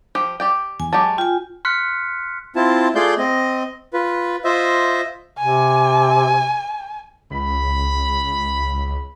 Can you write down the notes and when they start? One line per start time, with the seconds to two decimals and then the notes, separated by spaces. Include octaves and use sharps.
0.15 F3 G4
0.40 G4 D5 G5
0.80 E2 G#5
0.93 F#3 G#3 G4 A5
1.18 F4 G5 G#5
1.65 C6 F6 F#6 B6 C#7
2.56 C4 E4 F4 A5
2.95 A3 F4 G#4 D5 C6 G6
3.18 C4 D#5
3.93 F4 B4
4.44 F4 C5 D#5 E5
5.39 C3 G#5
7.30 C#2 B5